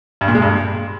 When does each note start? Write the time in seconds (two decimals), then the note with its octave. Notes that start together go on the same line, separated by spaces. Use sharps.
0.21 G2
0.28 A#2
0.35 G#3
0.42 G2